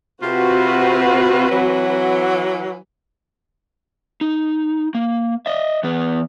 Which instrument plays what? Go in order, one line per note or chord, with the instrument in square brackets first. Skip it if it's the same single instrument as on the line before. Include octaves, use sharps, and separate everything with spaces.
[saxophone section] C3 F4 [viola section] C4 F#4 B4
[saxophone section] E3 F#3
[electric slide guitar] D#4
A#3
D#5 E5
E3 B3 B4